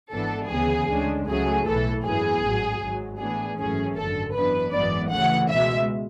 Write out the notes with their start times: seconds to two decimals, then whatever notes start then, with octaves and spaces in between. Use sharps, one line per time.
0.12 G#1 G#2 E3 B3 D4 A4
0.50 D2 C#3 E3 B3 G#4
0.88 D2 C#3 G#3 D4
1.27 C#2 C#3 F#3 A3 G#4
1.65 B1 A2 E3 A3 A4
2.04 G#1 F#2 E3 B3 G#4
2.42 A1 G#2 F#3
2.81 G#1 G#2 F#3
3.20 A2 E3 B3 D4 G#4
3.58 G#1 F#2 E3 A3 C#4 G#4
3.97 G#1 F#2 D3 A4
4.35 F#2 E3 B3 D4 B4
4.73 G#1 F#2 E3 G#3 B3 D5
5.12 D2 C#3 E3 A3 F#5
5.50 C#2 B2 G#3 E5